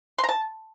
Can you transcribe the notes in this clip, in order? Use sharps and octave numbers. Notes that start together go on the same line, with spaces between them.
C6
A#5
A5